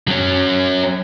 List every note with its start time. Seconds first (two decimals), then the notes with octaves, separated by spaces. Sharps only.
0.08 F#3 C#4